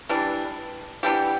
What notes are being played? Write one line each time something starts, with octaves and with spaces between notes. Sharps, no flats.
E3 G3 D4
E3 G3 B3 D4 G4